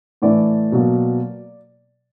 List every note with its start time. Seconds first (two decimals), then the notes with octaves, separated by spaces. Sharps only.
0.22 A2 E3 A3 D5
0.72 B2 F#3 A#3